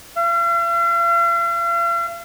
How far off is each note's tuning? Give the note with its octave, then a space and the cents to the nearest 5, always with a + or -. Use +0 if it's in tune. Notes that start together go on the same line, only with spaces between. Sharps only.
F5 -45